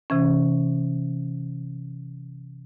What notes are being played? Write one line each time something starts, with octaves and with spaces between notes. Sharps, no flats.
C3 E3 C#4